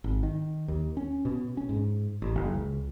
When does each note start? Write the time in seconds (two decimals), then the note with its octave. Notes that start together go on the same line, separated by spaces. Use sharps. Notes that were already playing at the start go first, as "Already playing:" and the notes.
0.04 G#1
0.23 D#3
0.68 D#2
0.97 C#4
1.25 B2
1.57 C#4
1.69 G#2
2.22 A1
2.36 F#1
2.54 C#2